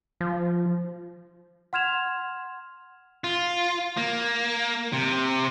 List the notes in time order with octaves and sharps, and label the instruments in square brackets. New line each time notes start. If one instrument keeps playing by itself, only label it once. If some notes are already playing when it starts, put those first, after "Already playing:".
[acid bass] F3
[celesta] F#5 C6 F6 G#6 E7 F7
[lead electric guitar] F4
A#3
C3